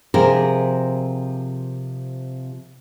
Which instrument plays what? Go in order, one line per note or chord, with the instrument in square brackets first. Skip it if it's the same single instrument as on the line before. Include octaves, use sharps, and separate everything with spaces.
[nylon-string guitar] C3 F3 G4 G#4 A#4